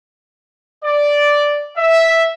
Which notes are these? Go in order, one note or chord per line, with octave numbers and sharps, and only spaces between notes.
D5
E5